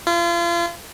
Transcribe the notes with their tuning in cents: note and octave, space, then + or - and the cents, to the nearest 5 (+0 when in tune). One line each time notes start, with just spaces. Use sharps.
F4 -35